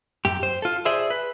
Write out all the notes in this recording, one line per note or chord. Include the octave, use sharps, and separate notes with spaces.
F#2 G4
C5
F4 A4
G#4 C5 D5 E5
B4